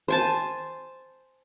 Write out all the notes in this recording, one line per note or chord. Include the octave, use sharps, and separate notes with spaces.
C5 G#5 A5